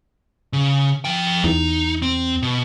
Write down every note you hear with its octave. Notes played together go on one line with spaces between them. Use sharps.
C#3
F3 G5
E2 D#4
C4
B2